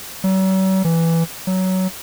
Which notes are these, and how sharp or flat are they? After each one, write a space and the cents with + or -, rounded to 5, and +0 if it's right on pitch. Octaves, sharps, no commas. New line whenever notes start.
F#3 +45
E3 +5
F#3 +15